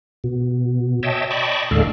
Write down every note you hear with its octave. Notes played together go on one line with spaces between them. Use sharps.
B2
C#5 D#5 E5 G5 A5
D5 D#5 G5 A5 B5 C#6
D#2 A2 D3 G#3 A4 F5